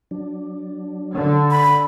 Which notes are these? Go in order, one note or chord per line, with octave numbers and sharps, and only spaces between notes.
F#3 D4
D3
B5